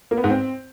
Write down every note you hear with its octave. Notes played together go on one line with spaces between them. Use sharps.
A#3
B3
G#2
C4